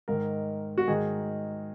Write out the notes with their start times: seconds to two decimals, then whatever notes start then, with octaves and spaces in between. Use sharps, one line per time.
0.08 G#2 D#3 A#4
0.78 F#4
0.88 G#2 D#3 G#4